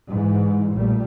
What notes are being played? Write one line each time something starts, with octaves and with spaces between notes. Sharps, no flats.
G#2 E3
A#1 A#2 G3 A3